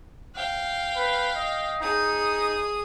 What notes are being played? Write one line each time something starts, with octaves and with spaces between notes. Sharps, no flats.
F5 G5
B4
D#5
D#4 G#4 D#6